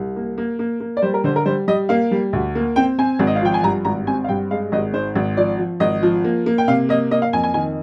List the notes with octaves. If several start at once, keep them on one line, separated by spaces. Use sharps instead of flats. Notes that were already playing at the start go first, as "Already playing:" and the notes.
Already playing: C2
A#3
A#3
A#3
A#3
D5
G3 C5
A#4
D3 C5
A#4
G3 C5
G3 D#5
A#3 F5
G3
D2
A#3
C4 G5
C4 G#5
G#1
D#5
F5
F3 G5
G#5
G2 A#5
G#1 A#5
C4 G#5
F5
G2 G5
G#3 F5
G#1 D#5
G#2 C5
G#1
F3 D5
F3
G#1 D#5
F3
A#3
A#3
G5
C3 F5
A#3 D#5
A#3 D#5
F5
F2 G#5
G#5
D#3 G#5